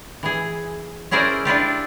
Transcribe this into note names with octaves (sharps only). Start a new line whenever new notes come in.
E3 G#4
C#4 E4 G#4 A#4 C5 D5
D4 E4 F4 G4